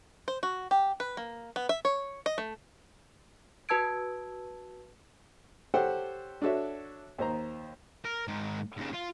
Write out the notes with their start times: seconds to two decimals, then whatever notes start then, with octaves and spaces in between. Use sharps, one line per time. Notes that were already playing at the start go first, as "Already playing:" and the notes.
0.28 C5
0.43 F#4
0.71 G4
1.00 B4
1.17 A#3
1.56 B3
1.69 E5
1.85 C#5
2.26 D#5
2.38 A3
3.69 F#4 B4 A5 E6 G#6 D7
5.74 G4 A4 C5 C#5 F#5 G5
6.42 D4 F#4 A4 C#5 E5
7.18 D#2 C5 A#5
8.05 A#4
8.28 G#2 D#3
8.78 D#2 C#3
8.94 F4